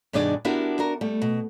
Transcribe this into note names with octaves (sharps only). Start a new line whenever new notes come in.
G2 B2 D#3 D4 G#4 D5
B3 D4 E4 F#4 G4 A#4
D4 F#4 A#4
G3 A3
B2